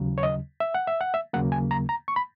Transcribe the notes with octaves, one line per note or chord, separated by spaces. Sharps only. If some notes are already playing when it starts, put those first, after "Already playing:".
Already playing: D#2 C#3 F#3
C#5
D#5
E5
F#5
E5
F#5
E5
D#2 C#3 F#3 A#3 F#5
G#5
A#5
A#5
C#6
B5